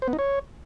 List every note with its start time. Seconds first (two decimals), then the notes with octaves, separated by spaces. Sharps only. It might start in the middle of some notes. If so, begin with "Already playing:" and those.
0.02 C5
0.08 B3
0.13 D#4
0.19 C#5